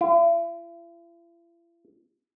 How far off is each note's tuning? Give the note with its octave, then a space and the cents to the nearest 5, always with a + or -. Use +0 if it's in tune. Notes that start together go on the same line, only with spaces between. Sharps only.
E4 +45